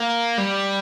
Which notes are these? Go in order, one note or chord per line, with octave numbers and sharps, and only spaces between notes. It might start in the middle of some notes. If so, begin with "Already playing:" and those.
Already playing: A#3
G3